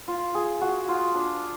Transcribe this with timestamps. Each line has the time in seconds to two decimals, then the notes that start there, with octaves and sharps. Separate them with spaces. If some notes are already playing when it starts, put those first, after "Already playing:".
0.08 F4
0.35 G#4
0.61 F#4
0.88 F4
1.15 D4